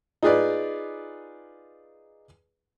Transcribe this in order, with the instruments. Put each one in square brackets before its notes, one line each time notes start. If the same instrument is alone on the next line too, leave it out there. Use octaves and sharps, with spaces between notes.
[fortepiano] D#4 F4 G#4 B4 D5